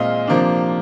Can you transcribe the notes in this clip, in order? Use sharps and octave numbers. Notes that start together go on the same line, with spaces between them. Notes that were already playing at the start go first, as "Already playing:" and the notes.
Already playing: A#2 G#3 C4 D#5 F5
C3 F3 A#3 D4